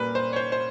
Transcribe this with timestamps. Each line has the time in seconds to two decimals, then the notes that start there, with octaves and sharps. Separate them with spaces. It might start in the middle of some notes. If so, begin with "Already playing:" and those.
Already playing: A#2 G3 A#3 B4
0.15 C5
0.33 C#5
0.36 C5
0.52 C5